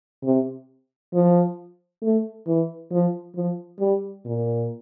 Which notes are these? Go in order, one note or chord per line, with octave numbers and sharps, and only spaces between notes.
C3
F3
A3
E3
F3
F3
G3
A#2